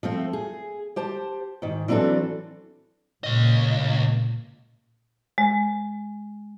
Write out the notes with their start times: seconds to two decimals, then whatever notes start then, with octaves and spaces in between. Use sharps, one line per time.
0.03 F3 A3 C4
0.33 G#4
0.96 G4 C5 A5
1.62 G#2 D#3
1.88 E3 F#3 C4 D4 A4
3.24 C#2 A#2 D#5
5.38 G#3